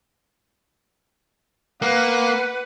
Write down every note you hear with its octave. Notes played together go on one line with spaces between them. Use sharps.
A#3 B4 F#5